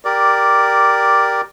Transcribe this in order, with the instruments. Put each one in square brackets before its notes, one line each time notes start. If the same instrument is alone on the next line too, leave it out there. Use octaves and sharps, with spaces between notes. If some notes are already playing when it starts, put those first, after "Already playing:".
[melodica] G4 A#4 D5